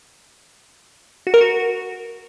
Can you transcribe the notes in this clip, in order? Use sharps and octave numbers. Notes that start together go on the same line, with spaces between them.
F#4
A#4
F#4